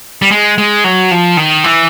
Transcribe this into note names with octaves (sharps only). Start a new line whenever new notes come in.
G3
G#3
G#3
F#3
F3
D#3
E3